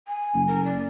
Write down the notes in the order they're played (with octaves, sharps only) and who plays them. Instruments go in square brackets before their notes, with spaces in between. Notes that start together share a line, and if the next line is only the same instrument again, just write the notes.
[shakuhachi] G#5
[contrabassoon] F#1
[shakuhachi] A#4
D5